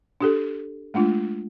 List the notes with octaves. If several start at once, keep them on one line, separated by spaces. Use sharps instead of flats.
D4 G4 A4
G#3 A3 D4 F4